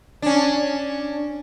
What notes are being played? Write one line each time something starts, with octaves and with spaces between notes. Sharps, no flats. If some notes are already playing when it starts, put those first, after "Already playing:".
C#4 D4